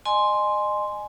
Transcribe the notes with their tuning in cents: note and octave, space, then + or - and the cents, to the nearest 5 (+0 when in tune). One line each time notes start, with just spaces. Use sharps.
D#5 -35 G#5 +10 C6 +0